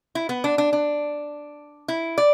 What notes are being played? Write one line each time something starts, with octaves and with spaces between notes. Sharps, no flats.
E4
B3
D4
D4
D4
E4
D5